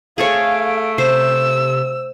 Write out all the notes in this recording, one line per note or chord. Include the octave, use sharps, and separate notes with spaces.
A3 G#4 A4 C#5 F5 D7
C3 C5 E6